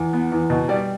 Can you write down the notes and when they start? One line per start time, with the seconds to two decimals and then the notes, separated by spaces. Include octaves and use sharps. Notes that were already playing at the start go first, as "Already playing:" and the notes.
Already playing: E2
0.13 B3
0.32 E2
0.50 B2
0.69 G3 D5